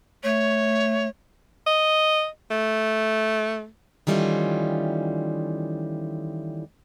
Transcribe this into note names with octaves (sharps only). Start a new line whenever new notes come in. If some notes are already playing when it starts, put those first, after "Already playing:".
A3 C#5
D#5
A3
D#3 E3 G3 A3 C#4 F4